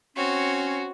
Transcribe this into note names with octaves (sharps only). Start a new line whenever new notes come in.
C4 C#4 F#4 C#5